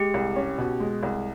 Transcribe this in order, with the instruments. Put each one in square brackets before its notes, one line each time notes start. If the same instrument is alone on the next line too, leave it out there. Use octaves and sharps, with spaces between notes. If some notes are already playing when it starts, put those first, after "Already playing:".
Already playing: [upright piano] G#3 [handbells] G4
[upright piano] C2
C#4
B2
G#3
C2